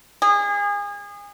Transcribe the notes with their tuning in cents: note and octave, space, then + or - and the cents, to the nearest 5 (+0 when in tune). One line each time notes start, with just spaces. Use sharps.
G#4 -30